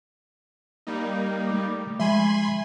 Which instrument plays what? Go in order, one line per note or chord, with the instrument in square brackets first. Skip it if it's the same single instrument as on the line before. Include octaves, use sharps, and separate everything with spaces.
[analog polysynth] G3 A#3 D#4
[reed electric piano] A3 D6
[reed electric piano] F3 G#3 E5 [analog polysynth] G#5 B5 C6